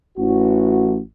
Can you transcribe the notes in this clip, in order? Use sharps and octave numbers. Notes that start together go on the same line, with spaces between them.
A1 F#4